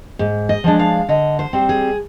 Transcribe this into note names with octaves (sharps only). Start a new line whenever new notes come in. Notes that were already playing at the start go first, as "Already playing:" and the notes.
G#2
D#5
F3 G#3 D4
F5
D3 D#5
C5
G3 C4
G#4